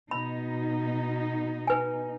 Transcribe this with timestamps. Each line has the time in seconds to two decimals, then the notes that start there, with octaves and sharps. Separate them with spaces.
0.11 B2 D#4 B5
1.67 B4 G#5